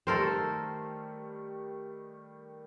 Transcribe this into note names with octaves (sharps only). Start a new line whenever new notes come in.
D#3 G3 A3 A4 A#4 C5